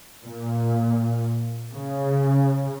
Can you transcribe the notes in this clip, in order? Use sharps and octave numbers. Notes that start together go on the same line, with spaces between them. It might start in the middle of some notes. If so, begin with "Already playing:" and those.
A#2
C#3